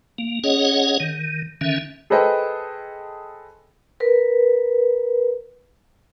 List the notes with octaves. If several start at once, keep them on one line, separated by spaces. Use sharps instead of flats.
A#3
C#4 G#4 C#5 D#5 F#5
D#3
D3 D#3 C#4 E5
G#4 A4 B4 C5 D#5 G5
A#4 B4